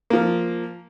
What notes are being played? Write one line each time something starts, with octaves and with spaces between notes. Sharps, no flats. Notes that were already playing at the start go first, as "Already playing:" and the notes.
F3 A#3